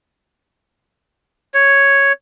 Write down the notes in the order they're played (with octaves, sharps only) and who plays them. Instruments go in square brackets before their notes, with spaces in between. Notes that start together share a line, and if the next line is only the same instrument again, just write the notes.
[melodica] C#5